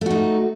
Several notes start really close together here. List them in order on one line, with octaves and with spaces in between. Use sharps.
A3 F#4 D#4